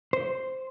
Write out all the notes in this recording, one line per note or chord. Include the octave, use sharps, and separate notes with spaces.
C5